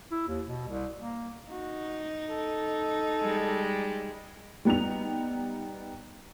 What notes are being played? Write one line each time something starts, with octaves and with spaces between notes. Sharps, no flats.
E4
D#2
B2
C2
A#3
D#4 F#4
A4
G3 G#3
G3 B3 D#4 F7